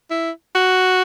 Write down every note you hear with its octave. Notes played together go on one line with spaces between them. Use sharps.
E4
F#4